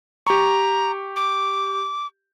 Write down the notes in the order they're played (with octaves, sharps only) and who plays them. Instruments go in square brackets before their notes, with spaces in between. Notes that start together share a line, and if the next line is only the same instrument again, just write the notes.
[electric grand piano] G4 C#6 [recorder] A#5
[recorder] D6